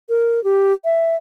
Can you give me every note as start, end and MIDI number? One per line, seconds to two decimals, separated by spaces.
0.09 0.43 70
0.44 0.73 67
0.85 1.16 76